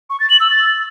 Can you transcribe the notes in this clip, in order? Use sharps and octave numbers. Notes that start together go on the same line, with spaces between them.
C#6
A6
F#7
E6
A6